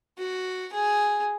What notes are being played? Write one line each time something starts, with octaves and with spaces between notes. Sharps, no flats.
F#4
G#4